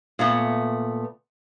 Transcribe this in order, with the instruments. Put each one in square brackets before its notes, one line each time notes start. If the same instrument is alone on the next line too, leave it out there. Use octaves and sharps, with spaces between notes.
[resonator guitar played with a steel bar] A#2 A3 B3